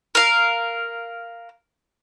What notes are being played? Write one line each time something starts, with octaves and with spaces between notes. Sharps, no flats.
A#4 F5